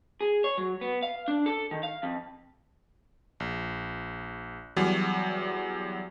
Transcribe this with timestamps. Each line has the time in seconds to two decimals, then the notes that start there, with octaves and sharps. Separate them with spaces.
0.21 G#4
0.44 C#5
0.58 F#3
0.81 B3
1.03 F5
1.28 D4
1.46 A4
1.71 D#3
1.83 F5
2.03 F2
3.40 A#1
4.76 E2 F#3 G3